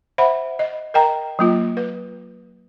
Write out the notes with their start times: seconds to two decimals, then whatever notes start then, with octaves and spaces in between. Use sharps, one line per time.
0.18 C5 E5 F#5 B5
0.59 D#5
0.94 A#4 D#5 G5 A#5
1.39 F#3 A#3 F4
1.77 B4